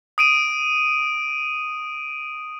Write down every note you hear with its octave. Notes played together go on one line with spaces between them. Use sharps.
D#6 D7 D#7